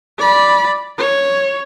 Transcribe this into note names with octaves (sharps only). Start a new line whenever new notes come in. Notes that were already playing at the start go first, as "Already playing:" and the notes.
D5 B5
C#5